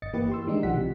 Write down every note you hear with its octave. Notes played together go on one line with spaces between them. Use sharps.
G1 D#5 A6 C#7
E3 A#3 G4 B4
G4 C6 E6
D#3 E3 G3 G#3 D4 D#4
B1 F3 G4 F#5 B6
C3